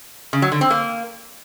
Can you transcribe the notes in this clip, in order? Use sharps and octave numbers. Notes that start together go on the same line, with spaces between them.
C#3
F#3
D3
C4
A#3